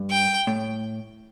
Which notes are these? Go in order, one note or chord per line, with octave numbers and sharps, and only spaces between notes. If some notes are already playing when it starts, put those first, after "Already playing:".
Already playing: G2
G5
A2